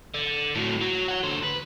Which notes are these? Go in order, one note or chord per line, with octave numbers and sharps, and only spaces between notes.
D3
A2 F#3
F#3
F#4 C#5
D3 C5
B4